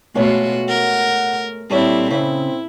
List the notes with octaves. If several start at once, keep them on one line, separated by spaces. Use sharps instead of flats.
B2 G#3 A3 F4 F#4 C#5
A#4 F#5
A#2 G3 C4 E4 A4 C#5
C#3 C4 E4